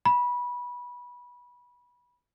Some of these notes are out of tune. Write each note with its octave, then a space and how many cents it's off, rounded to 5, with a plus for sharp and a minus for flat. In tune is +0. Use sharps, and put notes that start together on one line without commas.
B5 -20